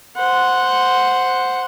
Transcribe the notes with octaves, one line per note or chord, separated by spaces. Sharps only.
C5 F#5